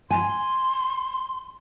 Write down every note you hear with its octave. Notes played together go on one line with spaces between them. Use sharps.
G#5 C6